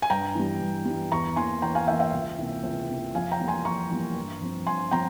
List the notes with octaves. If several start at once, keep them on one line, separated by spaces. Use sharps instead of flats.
G#5
G2 G5 A#5
E3 G3
G2
E3 G3
E2 A#5 C#6
E3 A#3 G#5 C6
E2 G5 A#5
F5 G#5
E3 A#3 E5 G5
E5 G5
C#2
C3 E3 A#3
C#2
C3 E3 A#3
F2 F5 G#5
G5 A#5
E3 G3 A#3
G#5 C6
F2 A#5 C#6
E3 G3 A#3
G2
F3 C4
G2 G#5 C6
F3 C4 G5 A#5